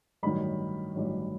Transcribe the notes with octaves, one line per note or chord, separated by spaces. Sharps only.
A1 G2 D#3 F#3 B5
A1 G2 D#3 F#3